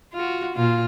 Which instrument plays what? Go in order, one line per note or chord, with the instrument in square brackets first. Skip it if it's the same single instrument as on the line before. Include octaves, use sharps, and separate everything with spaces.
[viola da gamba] F4 F#4
A#2 F4